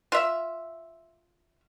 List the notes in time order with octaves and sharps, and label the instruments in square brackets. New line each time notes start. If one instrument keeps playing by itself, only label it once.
[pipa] F4 E5